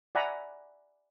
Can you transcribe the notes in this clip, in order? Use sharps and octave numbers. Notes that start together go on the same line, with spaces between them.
D5 E5 F#5 G#5 A#5 B5